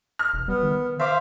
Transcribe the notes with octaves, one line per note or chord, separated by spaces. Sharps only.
F6
E1
G3 B3
D#3
C5 E5 F5 D6